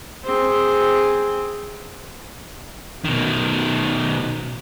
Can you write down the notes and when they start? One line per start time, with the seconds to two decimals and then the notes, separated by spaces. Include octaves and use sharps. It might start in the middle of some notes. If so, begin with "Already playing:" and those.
0.25 C4 G#4
3.05 B2 D#3